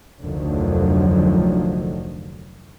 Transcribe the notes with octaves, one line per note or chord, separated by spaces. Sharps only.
F1 D2 D3 D#3 F3 F#3